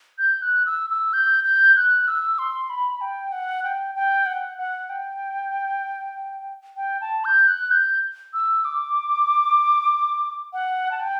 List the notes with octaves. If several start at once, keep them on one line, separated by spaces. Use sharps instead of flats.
G6
F#6
E6
E6
G6
G6
F#6
E6
C6
B5
G5
F#5
G5
G5
F#5
F#5
G5
G5
A5
G6
F#6
G6
E6
D6
F#5
A5
G5